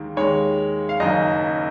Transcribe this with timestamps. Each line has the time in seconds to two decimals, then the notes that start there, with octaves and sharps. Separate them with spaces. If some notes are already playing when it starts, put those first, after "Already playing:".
Already playing: D#2 D#3 G#3
0.16 D#2 D#3 G#3 C#5
0.89 F5
1.00 F#1 F#2 D#3 D#5